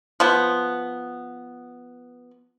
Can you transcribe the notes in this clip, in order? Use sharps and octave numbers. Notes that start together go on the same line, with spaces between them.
F3 B3